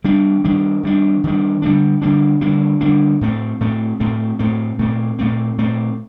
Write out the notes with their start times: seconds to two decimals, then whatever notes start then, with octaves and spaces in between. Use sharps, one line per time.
0.04 D#3 G3 D4
0.44 D#3 G3 D4
0.83 D#3 G3 D4
1.24 D#3 G3 D4
1.62 D3 G3 A#3 D4
2.02 D3 G3 A#3 D4
2.41 D3 G3 A#3 D4
2.81 D3 G3 A#3 D4
3.21 A2 A3 C4
3.60 A2 A3 C4
4.00 A2 A3 C4
4.39 A2 A3 C4
4.79 A#2 A3 C4
5.19 A#2 A3 C4
5.58 A#2 A3 C4